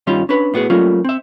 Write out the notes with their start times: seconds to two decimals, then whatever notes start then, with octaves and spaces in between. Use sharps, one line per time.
0.07 G2 D#3 G3 C#4 F4 C6
0.29 C#4 D4 B4
0.54 A2 B3 F#4 G#4
0.70 F#3 G3 A3 A#3 C#4 F4
1.05 C4 E5